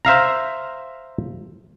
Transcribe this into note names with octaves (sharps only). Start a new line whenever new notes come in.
C5 E5 F5 A#5